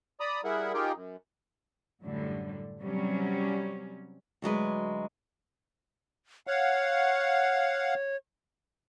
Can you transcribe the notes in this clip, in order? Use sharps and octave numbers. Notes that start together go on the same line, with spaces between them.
D5 A#5 B5 D#6
G3 E4 G#4 A#4 E5 F#5
D#4 F4 G4 G#4 A#4 G5
F#2
F#2 A2 D3 G3
C3 F#3 G3 C#4
D2 F#3 G#3 B4
C#5 F5 F#5